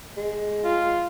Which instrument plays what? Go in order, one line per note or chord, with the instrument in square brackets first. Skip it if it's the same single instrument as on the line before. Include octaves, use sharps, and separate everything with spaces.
[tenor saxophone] G#3
[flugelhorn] F4